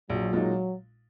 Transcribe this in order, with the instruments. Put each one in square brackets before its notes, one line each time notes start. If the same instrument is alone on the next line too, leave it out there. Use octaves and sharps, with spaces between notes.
[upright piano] A#1 [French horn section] F#3
[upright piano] A#2 G#3 D#4